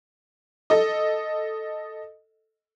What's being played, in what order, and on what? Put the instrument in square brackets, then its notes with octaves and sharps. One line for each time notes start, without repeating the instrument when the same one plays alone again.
[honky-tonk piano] A4 D#5